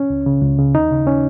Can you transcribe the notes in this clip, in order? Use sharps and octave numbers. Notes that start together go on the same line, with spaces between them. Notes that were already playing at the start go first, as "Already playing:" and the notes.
Already playing: C#4
C#2
C#3
C#2
C#3
D#2 D#4
C#3
C#4